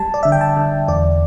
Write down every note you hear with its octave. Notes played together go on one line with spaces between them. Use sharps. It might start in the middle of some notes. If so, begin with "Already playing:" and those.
Already playing: G3 A5
D5
D3 E5
G5
A5
D3
E2 D5